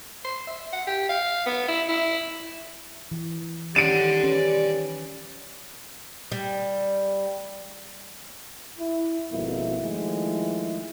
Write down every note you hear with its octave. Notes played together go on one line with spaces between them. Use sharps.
C6
E5
F#5
G4
F5
B3
E4
E4
E3
D#3 G3 C#4 D5 F#5 D7 D#7
C#4 B4
G3
E4
G#1 F2 B2 G#3 A#3 E4
D#3 F3 G#3 A3 E4